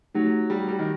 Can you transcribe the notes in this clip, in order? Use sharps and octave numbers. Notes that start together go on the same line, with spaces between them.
F#3 A3 D#4 G4
G3
G3
D#3